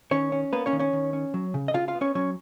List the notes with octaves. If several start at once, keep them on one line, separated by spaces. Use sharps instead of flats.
D#3 C#4 C#5
C#4
A#3 B3 B4
C#4 C#5
D#3
C#4 C#5
D#3
C#4
F#3
C#3
D#5
C#3 F4 F5
F4 F5
B3
C#4 C#5
F#3 C#4 C#5